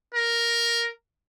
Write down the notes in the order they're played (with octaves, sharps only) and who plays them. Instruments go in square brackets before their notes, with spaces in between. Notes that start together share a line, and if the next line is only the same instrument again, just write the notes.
[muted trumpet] A#4